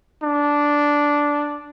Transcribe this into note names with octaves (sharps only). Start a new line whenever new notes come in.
D4